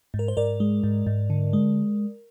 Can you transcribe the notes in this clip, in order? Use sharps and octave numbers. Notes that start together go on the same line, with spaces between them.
G#2
A#4
C5
G#2 A#4 D5
G#3
G#2
G#2
D3
G#3